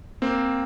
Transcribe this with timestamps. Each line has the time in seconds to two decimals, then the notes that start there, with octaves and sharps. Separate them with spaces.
0.22 A#3 C4